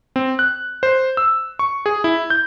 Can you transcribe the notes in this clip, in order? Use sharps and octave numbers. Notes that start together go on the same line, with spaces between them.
C4
F#6
C5
E6
C#6
G#4
E4
G6